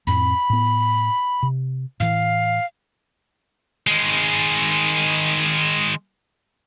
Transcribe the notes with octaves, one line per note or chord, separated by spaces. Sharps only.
F2 A2 C4 B5
A2 B3
C3
A2 E3 F5
D#3 G#3